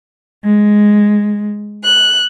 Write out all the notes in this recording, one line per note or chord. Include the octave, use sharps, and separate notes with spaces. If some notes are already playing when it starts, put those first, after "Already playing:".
G#3
F#6